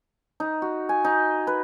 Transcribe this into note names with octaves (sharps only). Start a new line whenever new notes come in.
D#4
F#4
G#5
D#4
B4